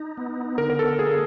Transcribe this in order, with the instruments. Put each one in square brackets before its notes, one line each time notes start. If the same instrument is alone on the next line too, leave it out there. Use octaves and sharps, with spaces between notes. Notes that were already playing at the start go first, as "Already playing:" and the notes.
Already playing: [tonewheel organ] D#4
B3
[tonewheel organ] D3 [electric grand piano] A#4
[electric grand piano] A#4
A4
[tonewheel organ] A#3 [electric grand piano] G#4